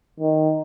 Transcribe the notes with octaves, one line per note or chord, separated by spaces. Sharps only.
D#3